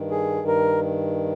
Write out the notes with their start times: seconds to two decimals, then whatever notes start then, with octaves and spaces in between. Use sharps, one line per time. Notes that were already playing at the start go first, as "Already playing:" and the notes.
Already playing: G2 D#3
0.11 G#4
0.47 A#4